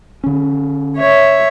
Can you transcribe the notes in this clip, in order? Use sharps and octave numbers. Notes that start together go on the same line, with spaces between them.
D3 C#4
C#5 E5